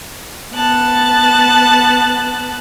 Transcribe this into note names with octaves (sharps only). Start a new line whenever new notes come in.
B3 A5 F#6